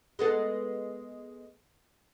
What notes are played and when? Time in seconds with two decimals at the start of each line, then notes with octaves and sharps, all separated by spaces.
0.19 G#3 B3 A4